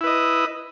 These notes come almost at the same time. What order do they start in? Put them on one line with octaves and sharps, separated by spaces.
E4 B4 D#5